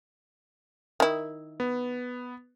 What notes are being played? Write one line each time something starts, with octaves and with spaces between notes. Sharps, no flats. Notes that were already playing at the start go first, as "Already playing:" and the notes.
D#3 E4
B3